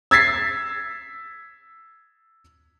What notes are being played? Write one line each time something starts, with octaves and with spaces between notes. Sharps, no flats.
E6 G#6 A6 B6 C7